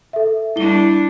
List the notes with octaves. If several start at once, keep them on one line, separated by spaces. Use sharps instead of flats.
A4 E5
G3 D4 E4 G7